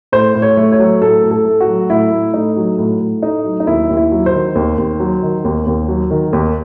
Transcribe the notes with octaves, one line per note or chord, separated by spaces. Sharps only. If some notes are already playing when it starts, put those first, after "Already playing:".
A2 C5
A2
C#5
A3
C#5
F#3
A2 A4
A2
A4
A3
F#4
F#3
A2 E4
A2
A3 D#4
F#3
A2
A2
A3 D#4
F#3
D#4
D#2 E4
D#2
E4
F#3
C5
D#3
D#2
D#2
F#3
D#3
D#2
D#2
F#3
D#3
D#2